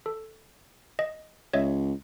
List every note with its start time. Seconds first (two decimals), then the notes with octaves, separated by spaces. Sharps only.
0.06 A4
0.99 D#5
1.53 C#2 C#5 D#5 E5